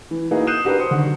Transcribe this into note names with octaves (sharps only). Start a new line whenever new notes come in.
E3
A#3 D#4 E4 F#4 G#4 B4
D#6 F#6 G6 C7 D#7 E7
D4 F#4 G4 A#4 B4
C5 D#6 C#7
D3 D#3 F#3 F#4